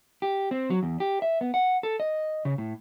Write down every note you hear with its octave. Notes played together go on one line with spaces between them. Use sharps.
G4
C4
F#3
E2
G4
E5
B3
F#5
A4
D#5
C#3
A2